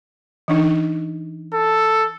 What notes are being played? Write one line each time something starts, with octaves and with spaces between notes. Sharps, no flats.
E3 D4 D#4
A4